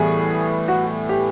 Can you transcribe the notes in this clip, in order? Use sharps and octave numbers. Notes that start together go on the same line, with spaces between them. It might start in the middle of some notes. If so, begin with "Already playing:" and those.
Already playing: A2 E3 G3 B3 G#4
F#4
G4